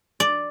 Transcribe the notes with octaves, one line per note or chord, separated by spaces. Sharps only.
D5